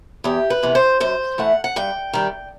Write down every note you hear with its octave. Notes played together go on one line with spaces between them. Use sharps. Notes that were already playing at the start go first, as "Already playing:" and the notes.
E2 G4
B4
C3 E3 B3
C5
F#2 C5
E3 A3 F#5
F#5
G2 G5
D#3 G3